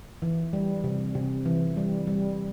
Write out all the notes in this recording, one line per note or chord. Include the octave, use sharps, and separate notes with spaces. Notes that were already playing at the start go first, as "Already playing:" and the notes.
E3
G3
C3
C3
E3
G3
G3